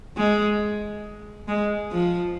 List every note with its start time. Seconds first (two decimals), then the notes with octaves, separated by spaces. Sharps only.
0.17 G#3
1.48 G#3
1.92 F3